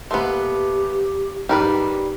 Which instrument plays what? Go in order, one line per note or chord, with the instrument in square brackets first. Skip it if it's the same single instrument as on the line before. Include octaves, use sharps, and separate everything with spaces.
[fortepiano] A#2 B4 C6 [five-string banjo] A3 B3 [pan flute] G4
[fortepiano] G#2 D#3 [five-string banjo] G3 A#4 B4 [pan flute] G4